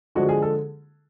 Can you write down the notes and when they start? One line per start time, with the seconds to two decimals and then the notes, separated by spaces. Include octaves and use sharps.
0.15 D3 F3 G#3 F#4
0.29 G#4
0.42 A4